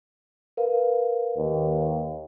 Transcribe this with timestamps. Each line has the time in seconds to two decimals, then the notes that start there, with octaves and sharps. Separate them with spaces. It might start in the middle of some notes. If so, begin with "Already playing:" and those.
0.57 A#4 B4 F5
1.37 D#2